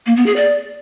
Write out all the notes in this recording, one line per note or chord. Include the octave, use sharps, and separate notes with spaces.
A#3
B3
G#4
D5